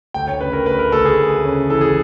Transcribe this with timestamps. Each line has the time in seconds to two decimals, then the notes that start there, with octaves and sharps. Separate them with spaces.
0.14 D2 G5
0.28 C#5
0.40 C#3 B4
0.53 A#4
0.66 D2 B4
0.79 A#4
0.92 D2 A4
1.05 G#4
1.18 D2
1.45 C#3
1.70 E3 A4
1.81 G#4